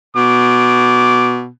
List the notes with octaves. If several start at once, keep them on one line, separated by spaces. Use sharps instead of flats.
B2 D6